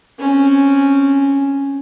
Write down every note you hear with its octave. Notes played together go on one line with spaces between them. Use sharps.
C4 C#4